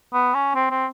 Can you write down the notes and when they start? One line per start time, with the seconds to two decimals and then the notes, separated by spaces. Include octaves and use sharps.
0.13 B3
0.34 C#4
0.55 C4
0.70 C4